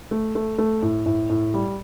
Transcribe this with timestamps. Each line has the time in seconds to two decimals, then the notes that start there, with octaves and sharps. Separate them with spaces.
0.11 A3
0.35 A3
0.58 A3
0.82 A2
1.06 A2
1.30 A2
1.54 G3